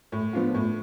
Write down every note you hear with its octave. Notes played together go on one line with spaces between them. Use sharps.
A2
F3 B3 D4 F4
A2